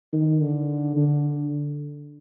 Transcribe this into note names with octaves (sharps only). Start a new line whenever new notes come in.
D#3
D3
D3